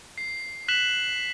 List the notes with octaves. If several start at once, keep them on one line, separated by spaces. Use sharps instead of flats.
C7
F#6 B6 E7 F#7